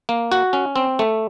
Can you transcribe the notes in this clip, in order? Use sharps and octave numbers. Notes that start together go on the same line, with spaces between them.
A#3
F#4
C#4
C4
A3